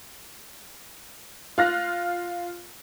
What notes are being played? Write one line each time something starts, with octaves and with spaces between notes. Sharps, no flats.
F4 F5 F6 F#6 A#6